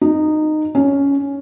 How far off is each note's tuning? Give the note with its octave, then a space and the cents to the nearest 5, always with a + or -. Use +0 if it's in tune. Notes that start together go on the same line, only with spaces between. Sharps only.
D#4 -15
C#4 +10